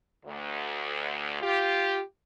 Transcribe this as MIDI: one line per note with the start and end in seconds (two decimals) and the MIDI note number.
0.25 1.38 38
1.41 2.01 65
1.41 2.01 67